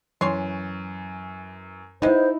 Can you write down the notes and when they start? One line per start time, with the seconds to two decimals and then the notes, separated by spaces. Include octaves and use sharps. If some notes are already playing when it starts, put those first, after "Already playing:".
0.21 F#2 E3 C#5 C6
2.02 G#3 B3 D#4 E4 C5